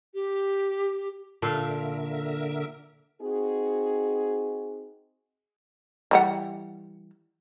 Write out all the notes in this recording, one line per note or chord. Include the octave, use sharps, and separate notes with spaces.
G4
A#2 D3 A4 A#4 E5 F5
C4 D#4 F#4 G#4
E3 G3 F#5